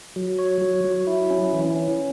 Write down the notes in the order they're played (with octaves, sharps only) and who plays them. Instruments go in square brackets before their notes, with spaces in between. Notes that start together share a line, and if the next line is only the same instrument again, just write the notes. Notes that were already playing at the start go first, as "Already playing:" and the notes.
[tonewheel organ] F#3
C#5
F#3
F#3
E4
C#4
E3
C#4